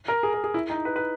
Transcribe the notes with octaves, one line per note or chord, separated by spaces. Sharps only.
A#4
G#4
A#4
G#4
E4
D#4
B4
B4